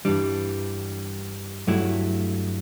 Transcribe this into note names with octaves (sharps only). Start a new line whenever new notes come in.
G2 E3 G3 D4
G2 F#3 A3 E4